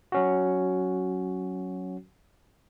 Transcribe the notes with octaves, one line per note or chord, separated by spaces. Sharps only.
F#3 C#4 F#4